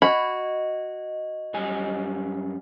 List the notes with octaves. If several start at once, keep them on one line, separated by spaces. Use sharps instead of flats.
F#4 D#5 B5
F#2 G3 G#5